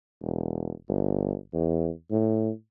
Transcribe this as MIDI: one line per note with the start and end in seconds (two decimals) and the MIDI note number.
0.22 0.71 28
0.89 1.34 31
1.53 1.90 40
2.11 2.50 45